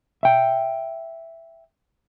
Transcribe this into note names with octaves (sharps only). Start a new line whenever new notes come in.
E5 G5